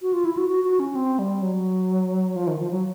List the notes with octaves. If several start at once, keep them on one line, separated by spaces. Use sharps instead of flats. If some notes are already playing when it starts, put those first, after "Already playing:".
F#4
F4
E4
F#4
F#4
F#4
C#4
C4
G3
F#3
F3
D#3
F3
F#3